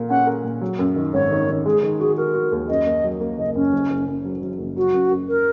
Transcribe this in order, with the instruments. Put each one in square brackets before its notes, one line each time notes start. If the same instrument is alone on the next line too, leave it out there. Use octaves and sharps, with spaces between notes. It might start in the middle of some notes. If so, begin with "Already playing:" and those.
Already playing: [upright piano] A#2 A#4
[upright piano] C#4 [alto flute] F#5
[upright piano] A#4
A#2
F#3
F#2
D#3
[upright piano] G#1 [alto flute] C#5
[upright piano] D#3
D#3
[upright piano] G#3 [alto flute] G#4
[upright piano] D#3
[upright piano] F#4 [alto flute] G#4
[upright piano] F#4 [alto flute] A#4
[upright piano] F#4
D#2
[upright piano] F#2 [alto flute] D#5
[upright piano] A#3
F#3
A#3
[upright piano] F#1 [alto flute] D#5
[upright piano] F#2 [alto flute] C#4
[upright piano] F#1
F#1
F#2
F#3
F#3
F#1
[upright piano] F#3 [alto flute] F#4
[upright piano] F#2
F#2
[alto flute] A#4